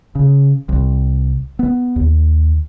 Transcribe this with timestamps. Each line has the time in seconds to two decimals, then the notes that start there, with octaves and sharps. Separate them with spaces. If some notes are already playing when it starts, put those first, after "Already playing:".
0.15 C#3
0.69 C2
1.59 B3
1.96 D#2